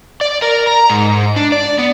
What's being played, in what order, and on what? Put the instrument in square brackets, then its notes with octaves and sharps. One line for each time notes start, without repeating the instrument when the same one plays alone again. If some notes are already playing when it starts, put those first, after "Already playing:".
[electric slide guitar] D5
A#4
A#5
G#2
D4
D5
B3